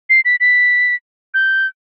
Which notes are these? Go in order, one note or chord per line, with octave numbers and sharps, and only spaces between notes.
C7
B6
B6
G6